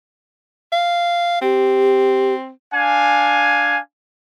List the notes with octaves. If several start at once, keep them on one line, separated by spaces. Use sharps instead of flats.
F5
C4 G4
D4 F5 G#5